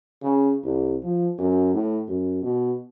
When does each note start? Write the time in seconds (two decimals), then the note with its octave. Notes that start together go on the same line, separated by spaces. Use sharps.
0.22 C#3
0.64 C2
1.03 F3
1.38 F#2
1.74 A2
2.08 F#2
2.42 B2